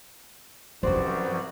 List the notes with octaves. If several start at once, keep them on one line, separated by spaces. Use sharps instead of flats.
C2 F#2 E3 F3 F#4 C5 D5